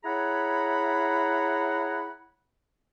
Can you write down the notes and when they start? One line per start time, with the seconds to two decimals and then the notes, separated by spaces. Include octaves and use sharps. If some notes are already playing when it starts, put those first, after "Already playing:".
0.05 E4 G#4 C#5 F#5 A#5 B5